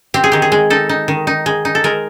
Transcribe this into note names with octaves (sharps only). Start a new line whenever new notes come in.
C4 G4
G#4
D#3 G4
G#4
G#3
D#4 A4
D#4
D#3
D#4
G#3
D#4
A4
G#3 A#4